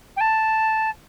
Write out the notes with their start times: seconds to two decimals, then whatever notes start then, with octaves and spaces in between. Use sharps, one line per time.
0.16 G5
0.20 A5